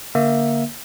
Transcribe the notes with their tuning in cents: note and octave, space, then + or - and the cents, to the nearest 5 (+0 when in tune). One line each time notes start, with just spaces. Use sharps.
D3 -30 A#3 +10 E5 +0